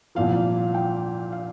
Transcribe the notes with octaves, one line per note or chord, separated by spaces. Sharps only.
C2 A#2 F3 F5
G5
F5